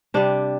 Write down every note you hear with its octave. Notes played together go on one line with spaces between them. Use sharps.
C3 G3 D4